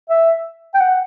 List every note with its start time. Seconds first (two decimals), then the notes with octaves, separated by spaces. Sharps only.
0.09 E5
0.74 G5
0.80 F#5